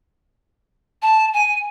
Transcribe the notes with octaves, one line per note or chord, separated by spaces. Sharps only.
A5
G#5